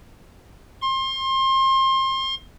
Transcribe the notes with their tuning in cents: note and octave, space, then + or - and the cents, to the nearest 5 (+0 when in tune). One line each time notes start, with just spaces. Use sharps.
C6 +30